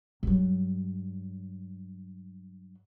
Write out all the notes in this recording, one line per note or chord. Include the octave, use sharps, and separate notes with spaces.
G2 F#3